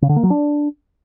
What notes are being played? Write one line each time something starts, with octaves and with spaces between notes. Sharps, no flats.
C#3
D3
A#3
F#3
D4